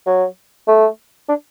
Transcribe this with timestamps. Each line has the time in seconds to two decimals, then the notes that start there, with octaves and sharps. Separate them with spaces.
0.06 F#3
0.68 A3
1.29 D4